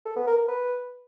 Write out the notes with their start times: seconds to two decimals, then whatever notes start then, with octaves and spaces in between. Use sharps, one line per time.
0.06 A4
0.16 B3
0.27 A#4
0.37 A#4
0.48 B4